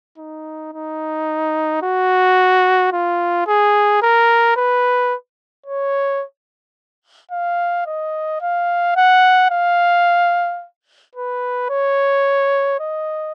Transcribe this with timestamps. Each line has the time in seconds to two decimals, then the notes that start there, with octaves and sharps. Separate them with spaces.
0.18 D#4
0.74 D#4
1.83 F#4
2.93 F4
3.47 G#4
4.02 A#4
4.57 B4
5.66 C#5
7.31 F5
7.86 D#5
8.41 F5
8.96 F#5
9.51 F5
11.15 B4
11.70 C#5
12.80 D#5